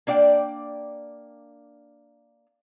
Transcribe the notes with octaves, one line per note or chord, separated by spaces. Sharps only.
A#3 D4 D5 F5 G5